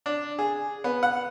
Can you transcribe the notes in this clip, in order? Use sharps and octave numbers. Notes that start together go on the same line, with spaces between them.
D4
G#4
B3
F#5